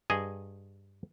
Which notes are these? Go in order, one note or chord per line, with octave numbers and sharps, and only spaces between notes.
G2 G#4 D#5 G#5